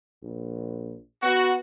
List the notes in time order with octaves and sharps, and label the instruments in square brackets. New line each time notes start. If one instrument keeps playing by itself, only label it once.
[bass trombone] A#1
[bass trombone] B3 [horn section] F#4